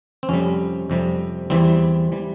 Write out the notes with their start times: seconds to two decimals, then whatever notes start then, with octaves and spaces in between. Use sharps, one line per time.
0.23 C4
0.29 F2 C3 G3 C#4
0.90 F2 C3 G3
1.50 E2 E3 G3 C4
2.12 E3 G3